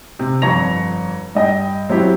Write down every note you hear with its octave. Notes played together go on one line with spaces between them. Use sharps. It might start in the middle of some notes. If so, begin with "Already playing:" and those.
C3
G1 F2 C#5 A#5 A#6 F7
G2 D#5 G5 A#6
F#3 C4 E4 G4